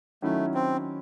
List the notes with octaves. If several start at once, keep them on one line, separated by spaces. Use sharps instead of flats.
D#3 F#3 A3 C#4 E4
C4